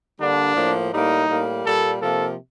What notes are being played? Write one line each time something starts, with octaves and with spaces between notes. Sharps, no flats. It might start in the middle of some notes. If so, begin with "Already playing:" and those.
D3 G3 A#3 D4
A2 F3 A#3
A2 G3 A#3 D#4
A2 G3 A#3
A#2 G3 A#3 A4
C3 F3 A#3 A4